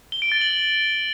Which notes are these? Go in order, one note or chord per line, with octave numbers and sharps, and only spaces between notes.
G7
D7
A6
F#7